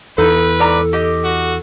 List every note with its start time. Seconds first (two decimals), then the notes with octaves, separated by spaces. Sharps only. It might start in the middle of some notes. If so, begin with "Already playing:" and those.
0.18 E2 E3 D#4 A4 B4
0.59 G#2 D5 A#5
0.93 G4 D#5
1.24 F#4